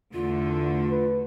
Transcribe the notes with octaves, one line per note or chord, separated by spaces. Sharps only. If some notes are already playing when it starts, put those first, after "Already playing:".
E2 D3 A3 F4
B4